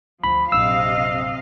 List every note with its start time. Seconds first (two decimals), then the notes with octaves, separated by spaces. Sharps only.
0.24 D2 F3 B5
0.52 A#1 F#2 C3 D#5 F5 E6